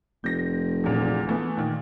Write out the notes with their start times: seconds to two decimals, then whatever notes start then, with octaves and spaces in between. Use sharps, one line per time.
0.24 F1 G6 A#6
0.84 E2 A#2 D3
1.27 E3 A3 B3
1.57 A#2 D#3